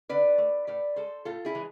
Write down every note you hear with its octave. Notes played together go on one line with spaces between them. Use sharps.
D3 B4 D5
A3
A2 B4 D5
G#3 A4 C5
A2 F4 A4
E4 G#4
E3 G#3